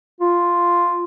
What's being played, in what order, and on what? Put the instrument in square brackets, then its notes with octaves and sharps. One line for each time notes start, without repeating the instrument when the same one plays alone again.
[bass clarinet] F4